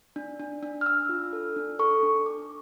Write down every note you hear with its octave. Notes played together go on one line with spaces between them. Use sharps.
D4
D4
D4
F6
D4 E6
F4
A4
D4
A4 C#6
D4
D4 D6